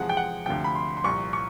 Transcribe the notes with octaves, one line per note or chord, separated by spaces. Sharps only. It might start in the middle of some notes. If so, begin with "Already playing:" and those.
Already playing: E2 C3 F3 G#3 F#5
G5
F#5
D2 C3 F3 G5
B5
C6
C6
C2 A#2 F3 C#6
C#6